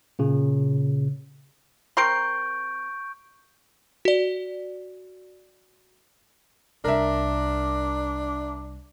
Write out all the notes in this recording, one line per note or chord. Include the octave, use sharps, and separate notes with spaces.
A#2 C#3
C4 A#4 C6 C#6 G6 D7
F#4 D5
C2 D4 A#4 E5